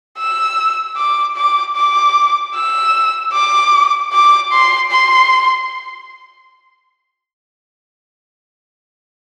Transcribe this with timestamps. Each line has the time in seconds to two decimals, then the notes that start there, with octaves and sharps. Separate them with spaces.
0.18 E6
0.97 D6
1.36 D6
1.76 D6
2.54 E6
3.33 D6
4.12 D6
4.52 C6
4.91 C6